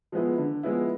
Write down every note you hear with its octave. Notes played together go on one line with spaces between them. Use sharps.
F3 G#3 B3 E4
D3
F3 G#3 B3 E4